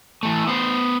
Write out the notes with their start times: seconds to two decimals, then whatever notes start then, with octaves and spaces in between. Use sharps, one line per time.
0.23 E3 A3
0.47 B3 C5